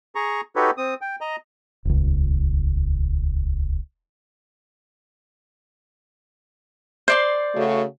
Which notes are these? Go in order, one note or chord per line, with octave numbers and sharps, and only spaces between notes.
G#4 A#5 C#6
D#4 F#4 G4 A4 B4 C#5
C4 D#6
G5
D#5 A#5
D#1 C#2
C5 D5 C6
C#3 A3 F#4